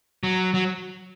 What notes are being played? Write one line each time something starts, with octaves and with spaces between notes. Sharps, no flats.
F#3
F#3